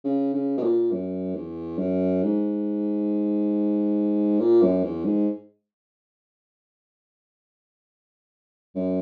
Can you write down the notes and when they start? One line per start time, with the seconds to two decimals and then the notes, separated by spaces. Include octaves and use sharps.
0.04 C#3
0.34 C#3
0.57 B2
0.63 A#2
0.91 F#2
1.35 E2
1.78 F#2
2.23 G#2
4.40 A#2
4.62 F#2
4.84 E2
5.05 G#2
8.75 F#2